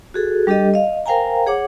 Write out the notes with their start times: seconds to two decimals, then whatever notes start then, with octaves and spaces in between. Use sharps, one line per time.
0.14 F#4 G#4 A4
0.47 G3 D4 G4 A4 D#5
0.74 D#5 F5
1.06 A#4 C5 F5 G5 G#5 A#5
1.47 G#4 C#5 F#5 D6